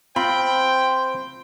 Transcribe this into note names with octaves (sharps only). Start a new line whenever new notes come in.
C4 F4 C5 G5 B5